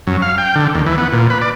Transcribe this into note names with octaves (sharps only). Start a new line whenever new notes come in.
F#2
F5
G5
D3
D#2
E3
B3
A#2
B4
D5